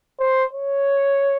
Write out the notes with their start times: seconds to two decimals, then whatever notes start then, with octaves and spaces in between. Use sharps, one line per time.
0.19 C5
0.53 C#5